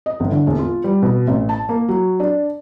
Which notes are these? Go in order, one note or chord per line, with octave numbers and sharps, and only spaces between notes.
D#5
G1
D3
E1
F4
G3
B2
A1
A5
A#3
F#3
D4